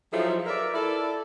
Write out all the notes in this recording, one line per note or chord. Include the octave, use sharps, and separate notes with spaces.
F3 F#3 D#4 E4 G#4 A4
A#4 B4 D5 E5
E4 A4 D5